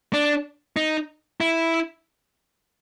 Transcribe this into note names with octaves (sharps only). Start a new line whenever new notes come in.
D4
D#4
E4